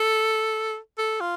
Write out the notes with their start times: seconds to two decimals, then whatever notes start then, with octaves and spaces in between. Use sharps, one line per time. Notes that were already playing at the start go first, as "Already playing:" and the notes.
Already playing: A4
0.98 A4
1.21 F4